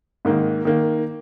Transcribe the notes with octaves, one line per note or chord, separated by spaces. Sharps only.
G#2 D#3 A#3
D#3 A#3